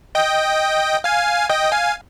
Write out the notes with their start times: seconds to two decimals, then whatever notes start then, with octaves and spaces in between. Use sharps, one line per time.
0.15 D#5 G5
1.04 F5 G#5
1.49 D#5 G5
1.72 F5 G#5